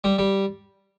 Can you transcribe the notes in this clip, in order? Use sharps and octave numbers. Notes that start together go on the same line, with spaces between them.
G3
G3